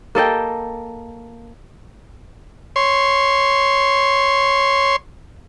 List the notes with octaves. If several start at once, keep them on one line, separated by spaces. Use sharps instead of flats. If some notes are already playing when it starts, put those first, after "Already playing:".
A#3 A4 D#5 G5
C#5 C6